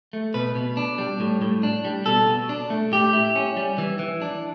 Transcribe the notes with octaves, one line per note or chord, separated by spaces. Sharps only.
A3
B2 B4
B2
D4
G3
A2
A2
D4
G3
B2 A4
B2
D4
A3
A2 G4
E4
C#4
G3
E3
E3
D4